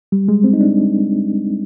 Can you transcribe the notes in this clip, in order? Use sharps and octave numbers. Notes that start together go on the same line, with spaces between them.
G3
G#3
C4
D#4
D4